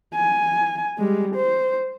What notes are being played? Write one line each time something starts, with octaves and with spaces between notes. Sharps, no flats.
G#5
G3 G#3
C5